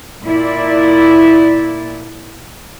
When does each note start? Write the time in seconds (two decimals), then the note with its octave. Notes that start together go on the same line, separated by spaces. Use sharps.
0.24 A#2 E4 D5